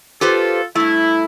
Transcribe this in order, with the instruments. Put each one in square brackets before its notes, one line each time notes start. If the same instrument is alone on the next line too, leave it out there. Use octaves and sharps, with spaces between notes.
[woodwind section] F4 A4 [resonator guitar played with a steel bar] G4 B4 C5
[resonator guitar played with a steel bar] G2 A3 [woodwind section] E4